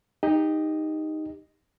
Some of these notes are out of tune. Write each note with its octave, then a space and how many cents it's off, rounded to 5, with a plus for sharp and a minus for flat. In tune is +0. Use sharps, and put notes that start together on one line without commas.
D#4 +0 G4 +25 D#5 +0